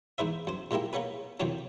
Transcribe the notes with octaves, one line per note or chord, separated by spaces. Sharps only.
E2 G#2 B4 C5 E5
F#2 C5
A#2 G#3 A#3 E4 G4
A#3 B3 C#4 G#4 B4
F2 C3 D#3 E3 F#3 D4